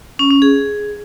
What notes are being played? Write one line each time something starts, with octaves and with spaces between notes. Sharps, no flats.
C#4
C#4
G#4